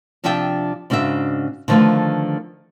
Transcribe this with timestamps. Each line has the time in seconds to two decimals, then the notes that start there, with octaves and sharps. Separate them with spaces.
0.24 C3 F3 D4 E5 G5 A5
0.90 G#2 C#3 D4 F#4 E5
1.68 D3 D#3 F3 A3 F4 B4